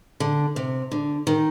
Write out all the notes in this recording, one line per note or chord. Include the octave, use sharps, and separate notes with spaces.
D3
C3
D3
D#3